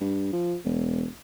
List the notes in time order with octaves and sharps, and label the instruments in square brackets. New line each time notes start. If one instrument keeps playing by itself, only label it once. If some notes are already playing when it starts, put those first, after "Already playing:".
[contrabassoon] G2
F3
E1